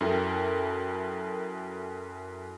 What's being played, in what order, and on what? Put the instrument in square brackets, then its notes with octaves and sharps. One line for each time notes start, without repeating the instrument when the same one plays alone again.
[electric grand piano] F#2 E4 A4 A#4 G5